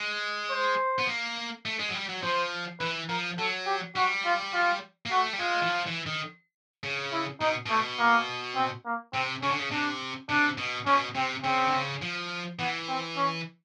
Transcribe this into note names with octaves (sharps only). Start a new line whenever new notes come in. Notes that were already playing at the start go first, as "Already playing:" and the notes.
Already playing: G#3
C5
B3
A#3
A3
G#3
F#3
G3
F#3
F3 C5
E3 B4
F3 A#4
F#3 A4
G4
G3 F#4
F4
F4
A#3
A3 F#4
G3
G#3 F4
E3
F3
E3
D#3
C#3
E4
B2 D#4
B2 A3
A#3
C4
A#3
C3 C4
C#3 C#4
D3
C#3
C3 D4
C3 D4
B2
B2 C#4
C3 C4
C#3 C4
D3
C#3
F3
E3 B3
C4
C#4